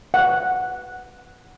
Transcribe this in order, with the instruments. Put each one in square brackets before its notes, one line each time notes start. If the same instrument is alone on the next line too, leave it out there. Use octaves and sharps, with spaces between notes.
[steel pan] F#5